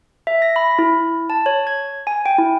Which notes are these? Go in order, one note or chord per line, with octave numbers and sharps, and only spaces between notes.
E5
A#6
B5
E4
A5
C#5
G#6
G#5
G5
E4